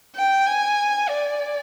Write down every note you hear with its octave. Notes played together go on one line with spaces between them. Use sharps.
G5
G#5
D5